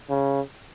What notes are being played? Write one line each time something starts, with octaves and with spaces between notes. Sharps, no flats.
C#3